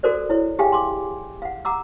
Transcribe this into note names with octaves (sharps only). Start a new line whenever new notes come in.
F#4 A4 A#4 C5 D5
E4 C#5
G4 G#4 E5 F5 G5 G#5
C6 D6
F5 F#5
F#5 A#5 D6 E6